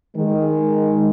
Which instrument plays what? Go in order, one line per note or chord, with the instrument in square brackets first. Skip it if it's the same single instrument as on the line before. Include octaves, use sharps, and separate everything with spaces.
[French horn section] D#3 G#3